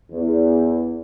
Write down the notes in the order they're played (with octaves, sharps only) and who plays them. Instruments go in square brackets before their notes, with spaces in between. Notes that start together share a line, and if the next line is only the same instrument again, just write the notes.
[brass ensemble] E2